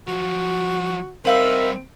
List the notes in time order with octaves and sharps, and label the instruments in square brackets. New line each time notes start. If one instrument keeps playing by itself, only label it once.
[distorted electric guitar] F3 F#3 [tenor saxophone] F#4
[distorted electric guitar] G3 D#4 [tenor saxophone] C4 [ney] A#4 [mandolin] E5 F5 B5